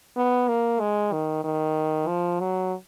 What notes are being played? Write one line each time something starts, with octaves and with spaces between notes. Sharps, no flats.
B3
A#3
G#3
D#3
D#3
F3
F#3